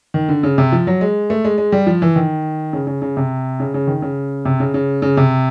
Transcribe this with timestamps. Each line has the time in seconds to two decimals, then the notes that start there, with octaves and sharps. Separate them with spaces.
0.14 D#3
0.29 D3
0.43 C#3
0.58 C3
0.72 F3
0.87 F#3
1.01 G#3
1.30 A3
1.44 G#3
1.58 G#3
1.72 G3
1.87 F3
2.02 E3
2.16 D#3
2.73 C#3
2.87 C#3
3.02 C#3
3.17 C3
3.60 C#3
3.74 C#3
3.87 D#3
4.02 C#3
4.45 C3
4.60 C#3
4.74 C#3
5.02 C#3
5.17 C3